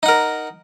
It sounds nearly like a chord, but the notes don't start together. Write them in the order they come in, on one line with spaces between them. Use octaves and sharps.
D#4 F#5 A#4